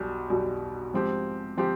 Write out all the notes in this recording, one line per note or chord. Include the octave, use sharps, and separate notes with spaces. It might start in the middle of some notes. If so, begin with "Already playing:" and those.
Already playing: B1 B2 G3
B1 B2 G3
G#2 F3 C4 G4
F3 C4 G4